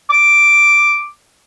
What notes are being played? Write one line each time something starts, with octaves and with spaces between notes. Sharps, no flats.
D6